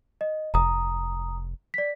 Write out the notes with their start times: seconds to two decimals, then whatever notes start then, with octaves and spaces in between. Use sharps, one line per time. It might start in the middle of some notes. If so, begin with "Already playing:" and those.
0.21 D#5
0.54 F1 A#5 D#6
1.74 D5 B6